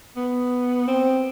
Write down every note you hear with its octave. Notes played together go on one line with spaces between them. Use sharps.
B3
C4